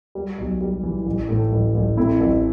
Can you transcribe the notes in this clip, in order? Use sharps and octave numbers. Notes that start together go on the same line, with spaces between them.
G3
B1
G3
E3
A1
A2
A1
A1
A2 C4 E4
A1